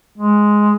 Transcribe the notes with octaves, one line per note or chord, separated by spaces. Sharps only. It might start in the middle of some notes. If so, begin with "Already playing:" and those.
G#3